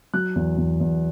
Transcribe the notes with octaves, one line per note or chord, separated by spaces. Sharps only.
F#3 F#6
E2
E2
E2